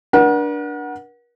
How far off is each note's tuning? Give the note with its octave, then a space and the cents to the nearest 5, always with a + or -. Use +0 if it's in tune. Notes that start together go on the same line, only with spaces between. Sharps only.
D4 +0 A#4 +45 F#5 +0